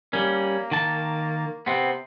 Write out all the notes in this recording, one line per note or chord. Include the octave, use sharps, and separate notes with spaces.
G3 A#3 C#4
D#3 A5
C3 B3 C4